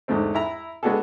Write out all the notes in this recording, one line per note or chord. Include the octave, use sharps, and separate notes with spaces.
E2 G#2 D3 A3 C4
E4 A#5 B5
G#3 B3 D4 F#4 G#4 A4